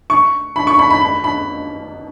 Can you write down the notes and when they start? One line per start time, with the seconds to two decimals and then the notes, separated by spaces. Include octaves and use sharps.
0.10 C#6
0.56 B5
0.67 C#6
0.79 B5
0.90 B5
1.01 B5
1.24 B5